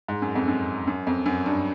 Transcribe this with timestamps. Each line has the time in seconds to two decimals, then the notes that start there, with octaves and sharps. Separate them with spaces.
0.08 G#2
0.22 F#2
0.35 F2
0.48 F#2
0.87 F#2
1.07 F2
1.26 F#2
1.46 G2